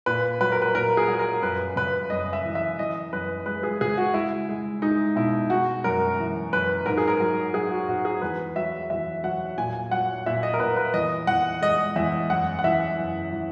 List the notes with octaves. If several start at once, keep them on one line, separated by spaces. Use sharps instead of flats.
A#2 B4
F#3 B4
A#4
B4
A#2 A#4
G#4
F#3
A#4
F#2 B4
C#3 B4
F#2 D#5
E5
E3
E5
E3 D#5
F#2 B4
G#3 B4
G#4
C#3 G#4
F#4
G#3 E4
G#3
G#3 D#4
B2 E4
G#3 F#4
F#2 A#4
E3
F#2 B4
G#2 A#4
G#4
A#4
F#3
F#3 G#4
F#4
G#2 F#4
G#4
E2 B4
F#3 E5
E2 E5
F#3 F#5
A#2 G#5
F#3 F#5
A#2 E5
D#5
A#4
A#2 B4
B4
E2 D#5
E2 F#5
G#3 D#5
E2 E5
F#2 F#5
F#5
E3 E5
F#2
E3